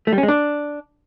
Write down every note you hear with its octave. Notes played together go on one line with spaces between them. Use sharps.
A3
G3
C#4
G#3
D4